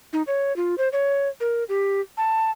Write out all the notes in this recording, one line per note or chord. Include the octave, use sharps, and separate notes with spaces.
D#4
C#5
F4
C5
C#5
A#4
G4
A5